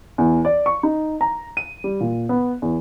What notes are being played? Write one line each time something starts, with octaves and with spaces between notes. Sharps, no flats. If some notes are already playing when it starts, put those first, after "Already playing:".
E2
D5
C#6
D#4
A#5
D#7
G3
A#2
B3
E2